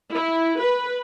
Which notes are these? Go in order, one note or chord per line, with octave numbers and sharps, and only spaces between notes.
E4
B4